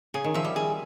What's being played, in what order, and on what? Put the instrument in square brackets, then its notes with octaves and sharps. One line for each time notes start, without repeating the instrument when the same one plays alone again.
[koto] C#3 [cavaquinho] G#4
[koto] D#3
[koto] F3 [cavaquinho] E5
[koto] G3
[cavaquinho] G#4